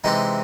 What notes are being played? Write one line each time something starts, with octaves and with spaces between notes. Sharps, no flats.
C3 E3 G#3 C4 D#4